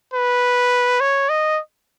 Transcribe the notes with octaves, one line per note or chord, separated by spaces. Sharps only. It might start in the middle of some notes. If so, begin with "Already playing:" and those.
B4
C#5
D#5